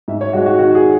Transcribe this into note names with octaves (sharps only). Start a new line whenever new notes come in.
G#2 E5
C#5
G#3 F#4
F#4
D#3 F#4
G#4